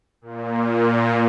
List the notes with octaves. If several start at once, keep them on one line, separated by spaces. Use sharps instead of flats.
A#2